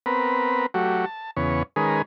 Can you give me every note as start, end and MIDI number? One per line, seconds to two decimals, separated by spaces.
0.06 0.66 59
0.06 0.66 60
0.06 0.66 70
0.06 0.66 71
0.74 1.05 54
0.74 1.05 57
0.74 1.05 66
0.74 1.05 67
1.06 1.31 81
1.36 1.63 40
1.36 1.63 49
1.36 1.63 59
1.36 1.63 73
1.76 2.02 51
1.76 2.02 56
1.76 2.02 61
1.76 2.02 68
1.76 2.02 70
1.76 2.02 71